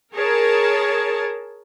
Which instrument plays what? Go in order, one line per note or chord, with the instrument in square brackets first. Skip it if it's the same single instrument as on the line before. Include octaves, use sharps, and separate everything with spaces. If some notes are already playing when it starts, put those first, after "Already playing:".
[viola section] G#4 A#4 C#5 A5